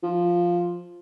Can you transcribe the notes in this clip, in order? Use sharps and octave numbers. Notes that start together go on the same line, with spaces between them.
F3